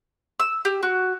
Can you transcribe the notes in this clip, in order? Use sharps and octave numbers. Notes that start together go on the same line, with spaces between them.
E6
G4
F#4